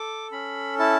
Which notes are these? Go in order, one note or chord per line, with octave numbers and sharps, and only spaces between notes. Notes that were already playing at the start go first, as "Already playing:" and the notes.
Already playing: A4 D6
C#4 B5
E4 A5